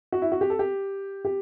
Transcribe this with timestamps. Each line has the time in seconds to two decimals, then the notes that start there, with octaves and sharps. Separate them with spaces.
0.12 F#4
0.22 E4
0.32 F#4
0.41 G4
0.50 A4
0.59 G4
1.25 G4